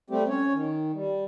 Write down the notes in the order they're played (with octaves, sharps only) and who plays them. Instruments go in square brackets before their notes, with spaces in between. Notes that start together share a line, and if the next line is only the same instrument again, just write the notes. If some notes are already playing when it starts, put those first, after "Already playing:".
[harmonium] G3 A3 C4 G4
C#4 C#5
D#3
G3